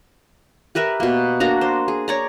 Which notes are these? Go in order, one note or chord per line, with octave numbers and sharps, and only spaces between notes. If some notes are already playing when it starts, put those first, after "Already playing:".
G4 A#4 B4 E5
B2 A#3
A#3 D4 F#4 A#5
C5
G#4
C#5 D5 A#5